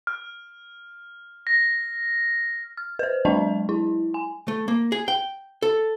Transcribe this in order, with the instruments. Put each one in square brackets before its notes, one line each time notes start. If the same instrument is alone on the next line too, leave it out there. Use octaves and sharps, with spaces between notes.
[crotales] F6
A#6
[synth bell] F6
B4 C5
F#3 G#3 D4 D#5 A5
E4
G#5
[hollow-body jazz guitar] A3
A#3
G#4
G5
A4